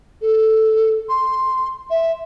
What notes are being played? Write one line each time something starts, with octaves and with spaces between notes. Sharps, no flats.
A4
C6
E5